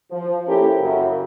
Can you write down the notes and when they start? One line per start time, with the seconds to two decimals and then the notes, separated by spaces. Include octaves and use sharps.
0.11 F3
0.48 A#3 C#4 E4 G4 A4 A#4
0.80 F#2 C#3 E4